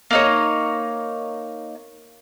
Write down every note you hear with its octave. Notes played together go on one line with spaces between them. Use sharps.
A#3 D#4 C#5